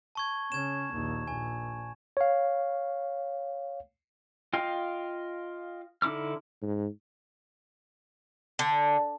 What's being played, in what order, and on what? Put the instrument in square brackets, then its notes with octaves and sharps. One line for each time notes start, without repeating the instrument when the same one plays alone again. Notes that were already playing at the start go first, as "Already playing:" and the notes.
[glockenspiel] A5 C#6 G#6
[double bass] C#3 C#4 [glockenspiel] G#6 E7
[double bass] A#1 D#2
[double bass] A#1 [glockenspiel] G#5
[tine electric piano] C#5 F5
[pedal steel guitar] F4 D#5 F5 G5
D3 D#4 E4 D6 F6
[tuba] G#2
[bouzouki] D3